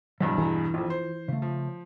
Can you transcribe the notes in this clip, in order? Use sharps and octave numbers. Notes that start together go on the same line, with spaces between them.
E2 G2 B2 F#3
E3 G#4 F#5 A#5
A#1 F2 F4
C5
C#3 A3
F3